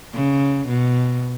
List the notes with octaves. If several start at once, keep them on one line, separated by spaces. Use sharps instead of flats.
C#3
B2